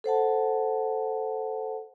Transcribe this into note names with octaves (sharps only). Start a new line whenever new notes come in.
A4 C5 F#5 A5